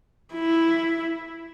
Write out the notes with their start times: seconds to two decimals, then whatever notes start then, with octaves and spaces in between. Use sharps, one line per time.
0.34 E4